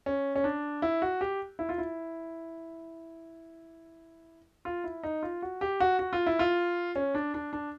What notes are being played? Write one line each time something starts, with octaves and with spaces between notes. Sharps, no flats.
C#4
C#4
D4
E4
F#4
G4
E4
F4
E4
F4
E4
D#4
F4
F#4
G4
F#4
F#4
F4
E4
F4
C#4
D4
D4
D4